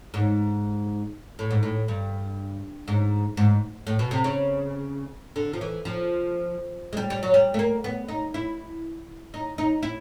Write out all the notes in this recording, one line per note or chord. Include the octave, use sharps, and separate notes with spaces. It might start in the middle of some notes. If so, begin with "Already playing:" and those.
G#2
A2
G#2
A2
G2
G#2
G#2
A2
B2
C3
C#3
D3
F3
E3
F3
G#3
G3
G3
F#3
G3
A3
A#3
B3
D#4
E4
D#4
D#4
E4